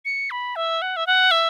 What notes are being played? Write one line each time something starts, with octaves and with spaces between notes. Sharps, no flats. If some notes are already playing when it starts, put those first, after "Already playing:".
C#7
B5
E5
F#5
E5
F#5
E5